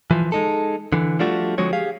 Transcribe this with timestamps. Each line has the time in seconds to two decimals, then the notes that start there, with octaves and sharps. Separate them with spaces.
0.11 E3 F3
0.32 G#3 D#4 A4
0.92 D3 E3
1.19 F3 G3 A3 D4 F4 F#4
1.58 D3 F3 G#3 C4 F#4 C#5
1.73 G4 G#4 F5